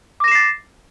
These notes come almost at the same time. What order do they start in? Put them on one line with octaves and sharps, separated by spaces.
D6 A#6 E7 C7 A6